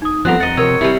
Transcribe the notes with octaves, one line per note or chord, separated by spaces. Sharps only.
D#4 D#6
F3 G3 B3 C4 A4 F#5 A#5 F#6
F2 D#5 F#5 A6
C3 F3 A#4 C#5 E6
C3 G3 E4